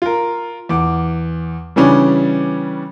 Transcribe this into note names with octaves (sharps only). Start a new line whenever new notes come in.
F4 A#4
E2 D6
C#3 E3 G3 C#4 D4